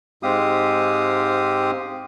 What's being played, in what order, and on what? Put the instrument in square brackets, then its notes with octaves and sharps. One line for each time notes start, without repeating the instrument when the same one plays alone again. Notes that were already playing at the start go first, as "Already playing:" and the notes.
[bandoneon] G#2 G#3 C4 G4 F5 D#6